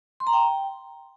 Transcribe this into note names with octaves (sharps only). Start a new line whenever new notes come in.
C6
A#5
G5